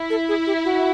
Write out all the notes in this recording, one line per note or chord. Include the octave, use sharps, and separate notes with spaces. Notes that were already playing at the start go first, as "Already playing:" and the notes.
Already playing: E4
A4
G#4
G4
F#4